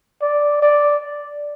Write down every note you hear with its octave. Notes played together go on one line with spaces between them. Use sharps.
D5
D5